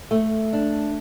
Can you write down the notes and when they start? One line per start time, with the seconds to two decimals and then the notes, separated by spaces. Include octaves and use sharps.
0.11 A3
0.53 D4